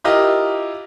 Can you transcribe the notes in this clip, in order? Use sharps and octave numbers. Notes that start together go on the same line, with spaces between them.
E4 F4 G4 A#4 D#5